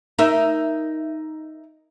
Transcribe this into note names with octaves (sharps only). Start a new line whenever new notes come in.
D#4 A#4 E5